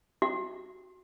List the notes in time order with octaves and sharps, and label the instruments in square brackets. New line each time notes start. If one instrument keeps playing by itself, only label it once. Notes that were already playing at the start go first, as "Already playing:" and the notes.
[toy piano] F#4